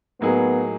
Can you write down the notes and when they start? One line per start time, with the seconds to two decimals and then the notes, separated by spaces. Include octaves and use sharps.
0.21 A2 F#3 A#3 B3 D#4 G#4